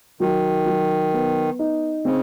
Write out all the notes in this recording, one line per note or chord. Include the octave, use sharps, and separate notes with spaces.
D#3 F#3
F#3
B3
D#4
C#3 C4